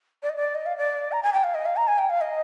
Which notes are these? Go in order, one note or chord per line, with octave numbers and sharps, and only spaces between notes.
D5
D#5
D5
D#5
F5
D5
A#5
G#5
G5
F5
D#5
F5
A#5
G#5
G5
F5
D#5